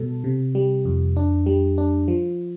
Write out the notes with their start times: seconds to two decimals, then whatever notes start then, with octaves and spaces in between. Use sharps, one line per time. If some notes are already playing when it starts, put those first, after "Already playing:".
Already playing: B2 G3 A4
0.24 C3
0.55 G3
0.85 F2
1.16 D4
1.46 G3
1.78 D4
2.08 F3